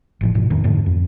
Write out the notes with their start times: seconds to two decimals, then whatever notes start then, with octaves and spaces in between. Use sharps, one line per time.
0.21 F1 A2 F3
0.35 G#2 B2
0.50 D1 F2 D#3
0.64 F2 G#2 D3 A3
0.86 F2